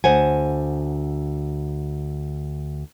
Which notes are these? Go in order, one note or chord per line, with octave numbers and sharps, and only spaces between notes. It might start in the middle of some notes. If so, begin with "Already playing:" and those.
D2 C5 F#5 G#5